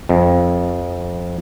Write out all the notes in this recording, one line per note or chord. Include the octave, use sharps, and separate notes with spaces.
F2